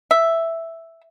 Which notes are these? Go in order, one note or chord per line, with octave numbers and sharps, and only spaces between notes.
E5